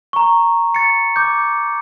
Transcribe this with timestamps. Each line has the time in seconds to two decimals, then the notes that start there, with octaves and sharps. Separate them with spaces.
0.13 A#5 C#6
0.75 A6 C#7
1.16 D6 G6